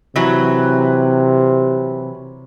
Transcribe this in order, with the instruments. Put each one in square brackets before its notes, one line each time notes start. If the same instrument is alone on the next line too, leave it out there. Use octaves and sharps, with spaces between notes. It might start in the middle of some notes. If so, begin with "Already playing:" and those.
[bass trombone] C3 [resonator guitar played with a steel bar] E3 F#3